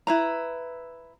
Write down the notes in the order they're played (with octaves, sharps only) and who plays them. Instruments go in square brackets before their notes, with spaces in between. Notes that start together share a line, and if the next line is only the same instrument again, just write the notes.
[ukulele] E4 B4 A#5